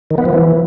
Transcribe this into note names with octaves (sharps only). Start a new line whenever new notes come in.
D#3
B3
F3
E3